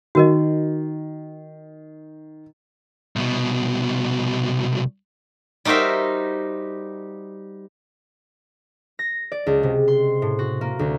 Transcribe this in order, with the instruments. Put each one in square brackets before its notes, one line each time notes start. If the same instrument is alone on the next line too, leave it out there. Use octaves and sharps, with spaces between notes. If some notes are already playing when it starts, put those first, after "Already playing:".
[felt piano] D#3 [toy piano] F#4 A#4 D#5
[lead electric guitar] C2 B2
[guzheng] G3 D#4 F#4 A#4 C5 E5
[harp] A#6
D5
C#2
C3
C6
A2
F#4
A#3
D2